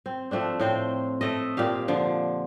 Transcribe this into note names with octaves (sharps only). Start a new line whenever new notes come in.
C4
F3 A3 C4 D4
A2 C4 C5 G5
A3 A4 D#5
A#2 C4 G4 F5
D3 F3